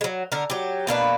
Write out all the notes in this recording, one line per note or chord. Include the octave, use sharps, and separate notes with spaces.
F#3 G#3
D3 A#4
F#3 G4
B2 A#3 D4 B4